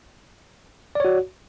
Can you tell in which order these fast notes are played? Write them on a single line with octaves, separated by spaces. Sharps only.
D5 C#5 F#4